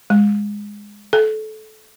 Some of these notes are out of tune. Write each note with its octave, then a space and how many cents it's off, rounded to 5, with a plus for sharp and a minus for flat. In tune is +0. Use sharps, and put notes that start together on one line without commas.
G#3 -10
A4 -20